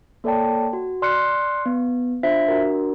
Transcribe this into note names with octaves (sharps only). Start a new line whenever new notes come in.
A#3 A4 C#5 D5 G5 A5
F#4
D5 C6 F6 F#6 C7 C#7
B3
D4 F4 C5 E5 B6
D4 F#4 A#4